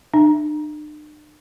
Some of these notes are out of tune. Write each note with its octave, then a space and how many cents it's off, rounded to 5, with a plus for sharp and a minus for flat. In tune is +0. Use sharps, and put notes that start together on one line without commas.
D4 +45